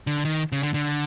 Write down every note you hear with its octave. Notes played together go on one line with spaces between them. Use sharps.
D3
D#3
C#3
D3
D3